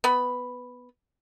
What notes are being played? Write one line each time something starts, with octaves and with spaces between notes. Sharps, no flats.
B3 B5